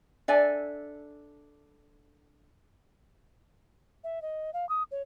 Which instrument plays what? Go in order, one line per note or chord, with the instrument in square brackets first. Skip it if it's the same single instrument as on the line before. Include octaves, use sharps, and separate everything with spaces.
[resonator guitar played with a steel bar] D4 A4 D5 E5 G#5
[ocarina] E5
D#5
F5
D#6
C#5